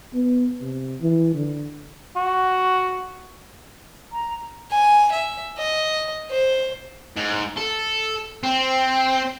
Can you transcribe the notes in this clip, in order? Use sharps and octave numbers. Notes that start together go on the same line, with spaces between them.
B3
C3
E3
D3
F#4
A#5
G#5
E5
D#5
C5
G#2
A4
C4